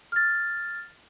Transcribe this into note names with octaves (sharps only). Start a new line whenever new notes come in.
F6 A6